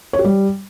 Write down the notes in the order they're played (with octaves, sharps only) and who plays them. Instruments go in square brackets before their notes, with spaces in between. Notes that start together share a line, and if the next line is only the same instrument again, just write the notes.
[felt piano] C#5
G4
G3